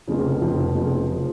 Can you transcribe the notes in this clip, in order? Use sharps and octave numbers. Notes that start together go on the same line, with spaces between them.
F1 F2 C#3 F3
F1 F2 C#3 F3
F1 F2 C#3 F3
C#3 F3